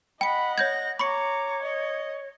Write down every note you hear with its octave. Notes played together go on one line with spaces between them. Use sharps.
D#5 F#5 G5 B5 C#7
C#5 G6 G#6 A#6
C#5 A#5 B5 C#6 D6 C#7
D#5